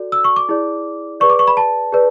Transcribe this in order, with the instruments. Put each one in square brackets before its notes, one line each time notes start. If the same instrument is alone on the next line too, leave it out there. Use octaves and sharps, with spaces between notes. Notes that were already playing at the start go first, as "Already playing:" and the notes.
Already playing: [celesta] F#4 A4 D5
E6
C#6
D6
E4 G#4 D5
G#4 B4 D5 C#6
D6
C#6
B5
A5
G#4 B4 D5